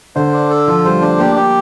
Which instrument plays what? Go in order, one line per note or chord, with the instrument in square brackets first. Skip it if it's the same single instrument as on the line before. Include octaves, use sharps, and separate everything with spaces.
[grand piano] D3 [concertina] C5
[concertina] D4
A4
[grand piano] F3 [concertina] F4
[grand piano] G3 [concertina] C5
[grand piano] A3 [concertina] D4
[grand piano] A#3 [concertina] G4
[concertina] G4